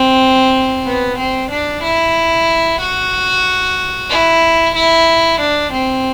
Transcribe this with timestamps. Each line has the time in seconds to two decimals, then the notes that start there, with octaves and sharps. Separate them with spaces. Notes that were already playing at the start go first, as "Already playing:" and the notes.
Already playing: C4
0.86 B3
1.19 C4
1.51 D4
1.84 E4
2.81 F#4
4.10 E4
4.75 E4
5.40 D4
5.72 C4